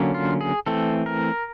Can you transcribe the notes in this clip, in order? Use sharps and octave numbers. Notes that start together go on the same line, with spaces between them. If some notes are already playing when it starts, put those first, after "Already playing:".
Already playing: D3 F#3 A#3 C#4
F4
G#4
E3 A3 C4 A4
A#4